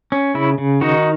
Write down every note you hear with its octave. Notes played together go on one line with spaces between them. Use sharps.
C#4
C#3 E4
C#3
D#3 D#4 F#4